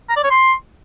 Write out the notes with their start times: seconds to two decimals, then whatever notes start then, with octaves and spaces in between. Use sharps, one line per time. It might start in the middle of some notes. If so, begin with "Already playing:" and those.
0.09 A#5
0.17 D5
0.24 C#5
0.31 C6